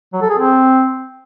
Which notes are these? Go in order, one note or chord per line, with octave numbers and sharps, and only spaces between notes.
F#3
A4
G#4
C4